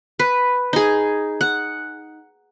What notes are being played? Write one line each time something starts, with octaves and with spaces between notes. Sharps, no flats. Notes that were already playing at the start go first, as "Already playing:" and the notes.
B4
D#4 G#4
F#5